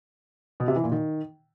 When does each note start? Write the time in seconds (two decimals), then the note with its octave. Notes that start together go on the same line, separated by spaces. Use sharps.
0.60 B2
0.68 C3
0.76 E3
0.84 A#2
0.92 D#3